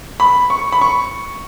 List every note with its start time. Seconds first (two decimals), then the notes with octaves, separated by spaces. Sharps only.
0.20 B5
0.50 C#6
0.72 B5
0.81 C#6